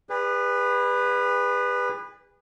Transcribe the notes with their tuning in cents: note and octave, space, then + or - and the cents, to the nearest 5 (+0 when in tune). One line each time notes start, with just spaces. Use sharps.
G#4 -40 B4 +0 D5 +0